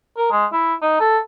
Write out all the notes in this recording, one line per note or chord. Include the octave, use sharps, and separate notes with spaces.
A#4
G#3
E4
D#4
A4